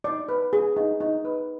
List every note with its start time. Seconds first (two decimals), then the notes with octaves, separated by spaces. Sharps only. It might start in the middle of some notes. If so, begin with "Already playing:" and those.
0.04 D#4 D5
0.29 B4
0.53 G#4
0.76 D#4
1.00 D#4
1.25 B4